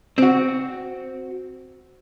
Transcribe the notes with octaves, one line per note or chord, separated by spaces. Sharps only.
C4 F#4